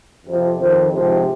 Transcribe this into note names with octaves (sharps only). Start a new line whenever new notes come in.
F2 C3 F3
F2 D#3 C4 C5
G#2 C3 F3 C4